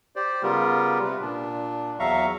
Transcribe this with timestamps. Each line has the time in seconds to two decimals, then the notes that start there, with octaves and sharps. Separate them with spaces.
0.16 G4 C5 D5
0.43 C#3 G3 B3 F4 G4 A#4
1.04 C3 B4
1.21 A#2 D4
1.99 E2 F#3 E5 F5 A#5 C#6